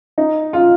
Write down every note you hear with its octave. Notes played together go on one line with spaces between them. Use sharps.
D#4
F4